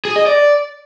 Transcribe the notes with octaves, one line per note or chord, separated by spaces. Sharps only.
G#4
D#5
D5